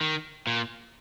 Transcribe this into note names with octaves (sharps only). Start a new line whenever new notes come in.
D#3
A#2